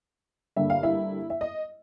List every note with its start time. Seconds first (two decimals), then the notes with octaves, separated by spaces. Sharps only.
0.56 G2 D3 G3 A#3 E5
0.70 F5
0.83 E4 E5
1.30 E5
1.41 D#5